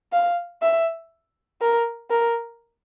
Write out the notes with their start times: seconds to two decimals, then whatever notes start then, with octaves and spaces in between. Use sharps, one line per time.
0.12 F5
0.62 E5
1.61 A#4
2.10 A#4